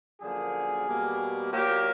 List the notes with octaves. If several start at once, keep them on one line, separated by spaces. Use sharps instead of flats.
F#2 D3 F3 A#3 G#4
B2 G3 A#3
A#2 F#3 A#3 G4